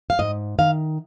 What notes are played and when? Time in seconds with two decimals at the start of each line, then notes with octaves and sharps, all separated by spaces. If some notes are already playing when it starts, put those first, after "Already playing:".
0.10 F5
0.19 G#2 D#5
0.58 D#3 F5